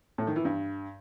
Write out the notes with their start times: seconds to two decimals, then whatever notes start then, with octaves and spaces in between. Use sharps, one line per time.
0.18 A2
0.27 D#3
0.36 E3
0.45 G2